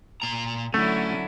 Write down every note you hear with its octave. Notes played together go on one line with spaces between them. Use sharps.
A#2 A#5
D3 F#3 A3 C#4 E4